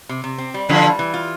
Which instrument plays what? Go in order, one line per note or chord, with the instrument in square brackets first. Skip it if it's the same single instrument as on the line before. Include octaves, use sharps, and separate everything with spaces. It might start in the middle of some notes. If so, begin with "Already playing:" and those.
[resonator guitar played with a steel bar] C3
C3
C4
G3
[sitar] D3 F3 [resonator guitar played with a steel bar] E3
[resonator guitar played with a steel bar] G3
E3
F4